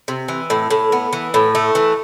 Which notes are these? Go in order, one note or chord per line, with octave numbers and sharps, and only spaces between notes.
C3
E3
A2
A2
B3
E3
A2
A3
E3